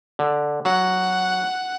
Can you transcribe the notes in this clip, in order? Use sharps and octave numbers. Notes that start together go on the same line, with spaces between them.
D3
F#3 F#5